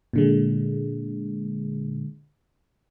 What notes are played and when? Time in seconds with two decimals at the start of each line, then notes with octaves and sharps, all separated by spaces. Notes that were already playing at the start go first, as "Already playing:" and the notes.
0.13 A#2 D3 G#3